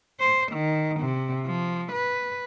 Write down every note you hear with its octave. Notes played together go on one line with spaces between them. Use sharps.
C5
D#3
C3
F3
B4